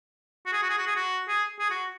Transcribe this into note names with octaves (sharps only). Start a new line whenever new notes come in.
F#4
G#4
F#4
G#4
F#4
G#4
F#4
G#4
G#4
F#4